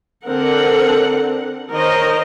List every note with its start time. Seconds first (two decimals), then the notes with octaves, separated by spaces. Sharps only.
0.25 D3 C4 D4 A#4 F#5
1.71 D#3 A#4 C5 C#5 D#5